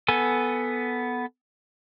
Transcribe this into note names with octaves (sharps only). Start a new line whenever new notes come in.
B3 A4 G#5